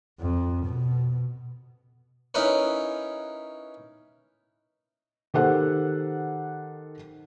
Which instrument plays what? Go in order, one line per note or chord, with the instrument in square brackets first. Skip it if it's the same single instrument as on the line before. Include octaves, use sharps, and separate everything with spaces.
[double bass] F2
B2
[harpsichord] C#4 D#4 E4 A#4 B4 C#5
[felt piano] D#3 G4 A4 C5 F#5 F#6